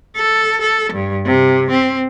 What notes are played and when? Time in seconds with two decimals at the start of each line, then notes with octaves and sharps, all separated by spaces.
0.17 A4
0.62 A4
0.93 G2
1.25 C3
1.71 C4